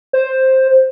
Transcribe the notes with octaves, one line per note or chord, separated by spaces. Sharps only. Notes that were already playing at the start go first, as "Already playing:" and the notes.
C5